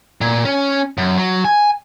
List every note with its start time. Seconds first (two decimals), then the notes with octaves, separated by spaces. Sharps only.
0.21 A#2
0.45 C#4
0.98 F#2
1.18 F#3
1.45 G#5